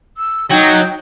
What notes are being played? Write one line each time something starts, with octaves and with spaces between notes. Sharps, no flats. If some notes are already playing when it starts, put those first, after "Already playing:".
E6
F#3 D#4 G5